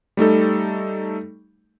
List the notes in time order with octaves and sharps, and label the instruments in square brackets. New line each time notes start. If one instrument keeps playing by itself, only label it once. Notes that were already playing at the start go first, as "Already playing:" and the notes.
[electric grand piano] G3 A3 D#4 A4